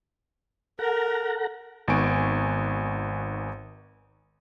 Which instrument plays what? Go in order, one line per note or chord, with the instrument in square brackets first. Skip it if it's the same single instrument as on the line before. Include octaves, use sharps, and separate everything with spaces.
[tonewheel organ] A4 F#5 A#5 [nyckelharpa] A#4
[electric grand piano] G#1 B3 D#4 G#5 C#6 D7